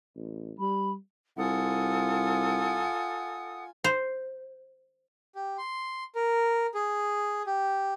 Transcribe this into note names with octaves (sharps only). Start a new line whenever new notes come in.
A1
G3 B5
C2 F4 A4 F#5 G#5 D#6
C5
G4
C6
A#4
G#4
G4